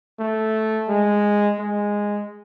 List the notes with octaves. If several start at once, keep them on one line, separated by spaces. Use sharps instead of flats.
A3
G#3
G#3